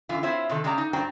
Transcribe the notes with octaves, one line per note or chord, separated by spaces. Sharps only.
F#2 D3 E3 F4
C4 E4 F4 C5 C#5 E5
C3 D#3 A4
C#3 G#3 G4 D5 A#5
D#4
G2 D4 F#4 C5 G5 A#5